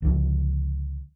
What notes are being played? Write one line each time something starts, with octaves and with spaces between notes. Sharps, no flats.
C#2 D3 F3